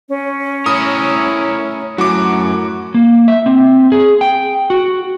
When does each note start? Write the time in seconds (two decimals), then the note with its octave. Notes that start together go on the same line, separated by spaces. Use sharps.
0.09 C#4
0.66 A2 E4 A#4 D#6
1.98 F#2 A2 F#4 D6
2.94 A#3
3.28 E5
3.46 C4
3.92 G#4
4.21 G5
4.70 F#4